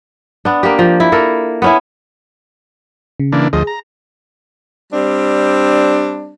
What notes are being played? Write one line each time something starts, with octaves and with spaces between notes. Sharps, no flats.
B3 D4
A#3 G4
F3
E4
A#3 A4 A#4
B3 C#4 E4
C#3
E3 A#3 D4
D2 F3 G#4 D#5
A#5
G3 C4 D4